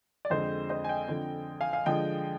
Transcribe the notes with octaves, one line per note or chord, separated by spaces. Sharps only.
D5
F2 D3 G#3 C4 C5 D#5
C5 D#5
G#5
D#5 G5
D3 F3 C4
F5 G#5
F5 G#5
D3 F3 G#3 D#5 G5